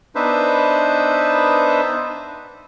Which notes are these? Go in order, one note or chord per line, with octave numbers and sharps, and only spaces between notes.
B3 D4 D#4 B4 C5 E5